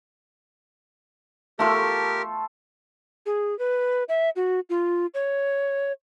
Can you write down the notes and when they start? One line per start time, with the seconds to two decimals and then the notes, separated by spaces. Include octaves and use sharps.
1.59 A3 F4 G4 A4 A#4
3.26 G#4
3.59 B4
4.09 E5
4.36 F#4
4.70 F4
5.14 C#5